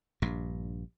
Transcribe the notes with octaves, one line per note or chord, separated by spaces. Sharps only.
A#1 G2